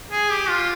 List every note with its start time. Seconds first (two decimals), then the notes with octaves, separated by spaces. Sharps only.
0.12 G#4
0.31 G4
0.50 F4